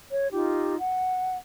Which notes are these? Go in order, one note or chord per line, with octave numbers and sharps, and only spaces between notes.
C#5
D#4 F4 G4
F#5